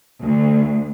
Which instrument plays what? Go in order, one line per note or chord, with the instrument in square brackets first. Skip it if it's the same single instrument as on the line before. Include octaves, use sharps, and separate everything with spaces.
[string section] D2